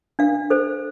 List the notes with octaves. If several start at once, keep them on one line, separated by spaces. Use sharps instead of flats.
D4 F5
A4 C5